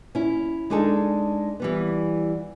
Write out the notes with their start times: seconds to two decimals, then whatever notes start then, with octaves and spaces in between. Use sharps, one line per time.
0.15 C#4 E4
0.70 G#3 D4 D#4 G#4 A4
1.60 E3 G3 B3